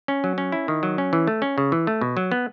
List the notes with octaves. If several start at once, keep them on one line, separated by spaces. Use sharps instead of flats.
C#4
F#3
C#4
E4
D#3
F#3
C#4
E3
A3
C#4
C#3
E3
A3
B2
F#3
B3